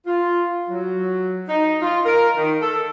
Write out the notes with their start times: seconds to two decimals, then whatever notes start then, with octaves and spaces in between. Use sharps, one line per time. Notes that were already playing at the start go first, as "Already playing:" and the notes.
0.07 F4
0.70 F#3
1.49 D#4
1.82 F4
2.06 A#4
2.37 D#3
2.62 A4